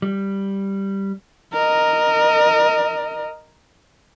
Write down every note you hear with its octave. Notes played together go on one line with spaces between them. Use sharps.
G3
A#4 D#5